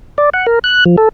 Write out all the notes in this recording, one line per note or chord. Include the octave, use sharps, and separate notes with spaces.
D5
F#5
A#4
F#6
F3
A4